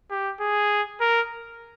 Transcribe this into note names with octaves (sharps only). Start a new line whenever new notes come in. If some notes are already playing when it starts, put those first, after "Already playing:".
G4
G#4
A#4